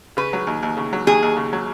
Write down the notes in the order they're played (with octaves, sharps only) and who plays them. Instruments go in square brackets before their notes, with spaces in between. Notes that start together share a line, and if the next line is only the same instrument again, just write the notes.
[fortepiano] C#3 [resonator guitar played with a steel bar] B4
[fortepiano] F#3
D#2
D#2
C#3
F#3
[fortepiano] D#2 [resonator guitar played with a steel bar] G#4
[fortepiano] D#2
C#3
F#3